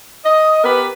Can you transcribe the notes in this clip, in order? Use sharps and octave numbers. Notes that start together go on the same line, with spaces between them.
D#5
B3 G4 A#4 B4